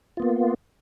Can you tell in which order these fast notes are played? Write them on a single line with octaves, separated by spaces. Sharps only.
F4 B3 A#3